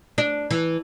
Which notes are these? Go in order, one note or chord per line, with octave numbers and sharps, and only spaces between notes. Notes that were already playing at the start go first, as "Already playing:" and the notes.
D4
E3